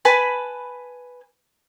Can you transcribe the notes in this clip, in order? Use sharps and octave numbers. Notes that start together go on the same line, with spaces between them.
B4 G#5 A5 B5